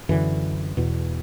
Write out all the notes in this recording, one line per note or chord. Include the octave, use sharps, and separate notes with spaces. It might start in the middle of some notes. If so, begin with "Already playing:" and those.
F#2 D3 E3
E2 B2